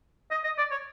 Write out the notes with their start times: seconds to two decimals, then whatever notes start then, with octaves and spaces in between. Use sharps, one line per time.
0.31 D#5
0.44 D#5
0.58 D5
0.71 C#5